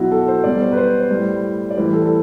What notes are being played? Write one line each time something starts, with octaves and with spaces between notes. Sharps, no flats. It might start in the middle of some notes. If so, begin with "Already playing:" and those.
Already playing: B2 F#3 E4 F#4
A4
C5
B2 G3 D5
C5
B4
C5
C5
A2 G3
D5
A2 E3 G3 C5
A4
A4